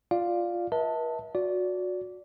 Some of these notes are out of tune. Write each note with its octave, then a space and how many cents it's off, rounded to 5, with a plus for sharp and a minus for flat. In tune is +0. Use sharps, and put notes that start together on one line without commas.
F4 +0 D5 +0 F5 +0
B4 -45 E5 -45 A5 +10
F#4 -25 D5 -20